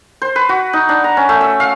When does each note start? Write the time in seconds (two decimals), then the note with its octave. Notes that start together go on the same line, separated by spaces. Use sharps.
0.22 C5
0.36 B4
0.49 F#4
0.73 D#4
0.89 D4
1.04 A#5
1.17 C#4
1.29 A3
1.41 E6
1.60 F5